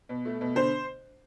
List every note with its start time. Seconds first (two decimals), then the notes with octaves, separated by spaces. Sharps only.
0.09 B2
0.25 A3
0.41 B2
0.55 D3 C5